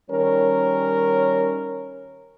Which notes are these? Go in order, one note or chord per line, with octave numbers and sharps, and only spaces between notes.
D#3 G3 C#4 A#4 C#5